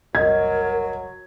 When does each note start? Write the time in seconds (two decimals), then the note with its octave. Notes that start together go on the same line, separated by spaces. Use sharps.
0.15 F#1 C2 F#3 A#4 D#5 G#6